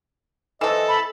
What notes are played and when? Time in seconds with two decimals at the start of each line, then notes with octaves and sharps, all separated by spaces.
0.61 E3 C4 A4 D#5
0.88 B5